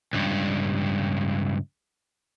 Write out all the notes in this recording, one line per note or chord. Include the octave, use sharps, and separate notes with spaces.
C#2 G2